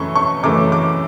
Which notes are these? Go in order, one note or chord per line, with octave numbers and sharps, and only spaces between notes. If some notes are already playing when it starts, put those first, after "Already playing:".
Already playing: F#2 C#3 E3 A3 C#6
C#6
F#2 C#3 E3 A3 D6
D6